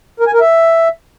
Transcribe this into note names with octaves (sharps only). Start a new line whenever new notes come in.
A#4
G#5
A#4
E5